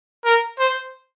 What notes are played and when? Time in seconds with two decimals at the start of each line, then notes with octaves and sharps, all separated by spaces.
0.25 A#4
0.59 C5